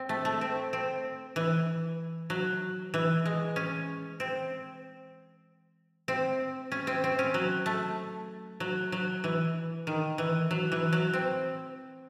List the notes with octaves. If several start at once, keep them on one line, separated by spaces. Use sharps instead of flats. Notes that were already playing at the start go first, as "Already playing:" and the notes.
Already playing: C4
A3
A3
C4
C4
E3
F#3
E3
G#3
C#4
C4
C4
C#4
C4
C4
C#4
F#3
A3
F#3
F#3
E3
D#3
E3
F#3
E3
F#3
C4